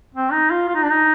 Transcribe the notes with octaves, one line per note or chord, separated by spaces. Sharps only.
C4
D#4
F4
F4
D#4
D4
D#4